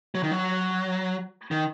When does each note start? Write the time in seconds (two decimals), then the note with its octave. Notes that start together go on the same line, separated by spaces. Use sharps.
0.15 F#3
0.23 D#3
0.31 F#3
1.51 D#3